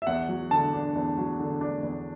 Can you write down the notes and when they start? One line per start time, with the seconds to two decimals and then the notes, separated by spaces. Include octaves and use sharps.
0.02 E5
0.07 E2 F#5
0.29 F#3
0.51 D3 A5
0.73 D4
0.95 E2
1.17 F#3
1.39 D3
1.61 D4
1.83 E2